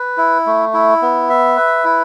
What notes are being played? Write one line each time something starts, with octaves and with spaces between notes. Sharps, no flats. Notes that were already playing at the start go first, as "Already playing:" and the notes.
Already playing: B4
E4
A3
E4
B3
E5
B4
E4